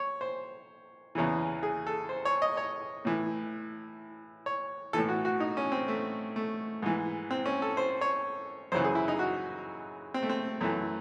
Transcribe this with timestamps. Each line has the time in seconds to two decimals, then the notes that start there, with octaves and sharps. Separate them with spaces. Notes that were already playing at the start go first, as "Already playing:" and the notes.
Already playing: C#5
0.21 C5
1.15 E2 C#3 E3
1.63 G#4
1.87 A4
2.09 C5
2.25 C#5
2.42 D#5
2.57 C#5
3.05 A2 E3
4.46 C#5
4.93 A2 E3 A4
5.09 F#4
5.25 F#4
5.40 D#4
5.57 C#4
5.72 C4
5.88 A3
6.36 A3
6.82 G#2 E3
7.31 C4
7.46 C#4
7.62 A4
7.77 C5
8.01 C#5
8.72 F#2 C#3 E3 C5
8.84 G#4
8.95 E4
9.08 D#4
9.19 F#4
10.14 C4
10.23 A3
10.29 C4
10.61 F#2 E3 A3